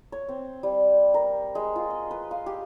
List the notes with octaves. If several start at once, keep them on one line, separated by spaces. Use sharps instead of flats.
C#5
C4
G3
A#4
G#3
F4
D#5
B4
F5
G4